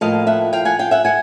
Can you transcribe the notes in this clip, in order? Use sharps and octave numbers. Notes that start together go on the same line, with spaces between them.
A2 F3 A#3 D#5 F5
E5 F#5
F5 G5
F#5 G#5
F5 G5
E5 F#5
F#5 G#5